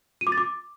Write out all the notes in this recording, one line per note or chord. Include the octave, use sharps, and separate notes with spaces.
D#7
D6
A6
D6